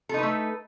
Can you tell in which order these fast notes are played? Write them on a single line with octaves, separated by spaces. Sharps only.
A4 D#4 B4 A3